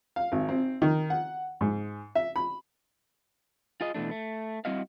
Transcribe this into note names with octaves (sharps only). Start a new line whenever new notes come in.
F5
G#1
C4
D#3
F#5
G#2
E5
B5
F4 G#4 D#5
B2 E3 A3 D4
A3
G3 C4 E4 F#4 D#5 F5